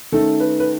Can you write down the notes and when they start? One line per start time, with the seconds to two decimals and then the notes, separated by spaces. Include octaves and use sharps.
0.12 D#3 A3 C#4 A4
0.40 B4
0.60 B4